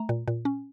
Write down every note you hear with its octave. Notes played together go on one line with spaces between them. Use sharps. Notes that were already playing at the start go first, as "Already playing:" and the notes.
Already playing: A3 A#5
A#2
A#2
C#4